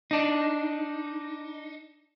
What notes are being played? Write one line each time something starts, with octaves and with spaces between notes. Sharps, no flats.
D4 D#4